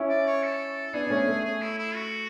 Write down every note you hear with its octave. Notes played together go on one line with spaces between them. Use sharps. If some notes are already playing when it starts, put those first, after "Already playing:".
Already playing: C#4 E4
D5
C#5
A4
B3 D4 G#4
D4
A3 C#4
A3
G#4
E4
E4
F#4